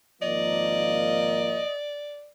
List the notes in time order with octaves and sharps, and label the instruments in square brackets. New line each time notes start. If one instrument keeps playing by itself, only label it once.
[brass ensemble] G#1 F3 A#3 [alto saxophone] D5 [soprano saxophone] D#5